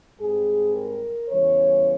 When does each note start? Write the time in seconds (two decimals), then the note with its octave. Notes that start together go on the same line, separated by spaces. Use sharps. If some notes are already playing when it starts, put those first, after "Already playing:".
0.18 G#2 G3 C4 G#4
0.73 A#4
1.28 E2 C#3 E3 G3 C#5